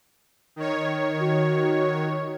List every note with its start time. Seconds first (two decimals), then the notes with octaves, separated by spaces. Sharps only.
0.56 D#3 C#5
1.20 F#4